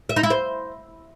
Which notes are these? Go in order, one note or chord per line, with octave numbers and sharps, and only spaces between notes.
E5
D#4
E4
C5